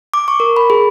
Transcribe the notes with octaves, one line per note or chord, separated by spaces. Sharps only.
D6
C#6
A#4
B5
G#4